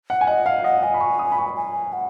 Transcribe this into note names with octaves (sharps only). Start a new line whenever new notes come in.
F#5
G#5
D#5 F#5
F5 F#5
D#5 F#5
D#5 G#5
B5
C#6
D#6
B5
C#6
G#5
F#5